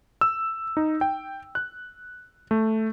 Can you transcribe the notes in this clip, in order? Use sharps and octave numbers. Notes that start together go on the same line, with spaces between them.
E6
D#4
G5
F#6
A3